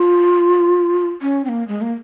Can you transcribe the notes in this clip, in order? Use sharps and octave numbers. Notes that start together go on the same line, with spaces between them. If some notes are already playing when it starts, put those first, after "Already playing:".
Already playing: F4
C#4
C4
A#3
G#3
A#3